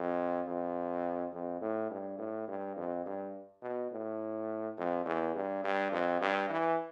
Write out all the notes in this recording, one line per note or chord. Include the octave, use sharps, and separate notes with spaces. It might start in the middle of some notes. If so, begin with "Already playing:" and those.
Already playing: F2
F2
F2
A2
G2
A2
G2
F2
G2
B2
A2
F2
E2
G2
G2
F2
G2
E3